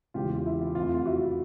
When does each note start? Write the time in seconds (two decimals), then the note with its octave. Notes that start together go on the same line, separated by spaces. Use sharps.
0.14 E2 C#3 E3 G#3 F4 G4
0.30 F4
0.46 E4
0.61 F4
0.75 F2 C3 F3 A3 F4
0.95 F4
1.05 E4 F#4